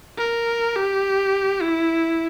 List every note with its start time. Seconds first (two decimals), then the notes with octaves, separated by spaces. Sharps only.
0.18 A#4
0.76 G4
1.62 E4